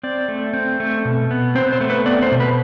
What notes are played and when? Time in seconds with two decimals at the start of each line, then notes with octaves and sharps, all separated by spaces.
0.03 C4 D5
0.28 A3
0.53 C4
0.80 A3
1.05 B2
1.31 B3
1.55 C4 C5
1.73 C5
1.81 A3
1.90 B4
2.06 B3 D5
2.22 C5
2.32 B2
2.40 B4